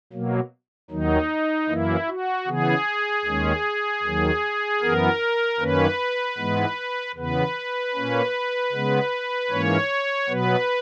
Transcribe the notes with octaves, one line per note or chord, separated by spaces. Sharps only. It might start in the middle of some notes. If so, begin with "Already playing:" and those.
B2 F#3 A#3
D#2 D#3 F#3 D#4
F#2 E3 A#3 E4
F#4
C#3 E3 B3 G#4
D#2 D#3 G#3 C#4
D#2 D#3 F#3
F#2 E3 B3 A#4
F#2 D#3 A#3 C#4 B4
G#2 E3 G#3 B3
E2 C#3 E3 B3 B4
A#2 A#3 C#4
C#3 G#3 B3
G#2 E3 A#3 C#4 C#5
B2 F#3 B3 B4